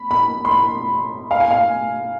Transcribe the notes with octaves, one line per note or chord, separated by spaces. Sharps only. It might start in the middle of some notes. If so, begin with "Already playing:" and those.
Already playing: B5
B5
C6
B5
F5
G#5
F5